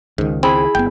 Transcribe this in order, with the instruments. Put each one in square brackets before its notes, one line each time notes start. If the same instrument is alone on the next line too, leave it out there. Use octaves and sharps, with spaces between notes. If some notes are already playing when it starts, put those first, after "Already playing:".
[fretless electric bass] C#2 D#3 [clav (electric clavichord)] G#2
[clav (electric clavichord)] C4 [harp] E4 G#4 B5
[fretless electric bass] G1 B3 [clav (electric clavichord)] G5